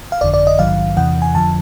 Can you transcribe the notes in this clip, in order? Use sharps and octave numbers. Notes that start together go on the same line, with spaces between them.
F5
G1 F2 D3 D5
D5
D#5
A#1 G#2 D#3 F#3 F5
E2 C3 E3 F#5
G#5
F2 D3 F3 A5